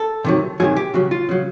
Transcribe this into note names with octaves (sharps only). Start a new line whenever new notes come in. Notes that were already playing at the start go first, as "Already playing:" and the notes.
Already playing: A4
C3 D#3 F#3
C3 D#3 F#3 G#4
G4
C#3 F#3 F#4
F4
C#3 F#3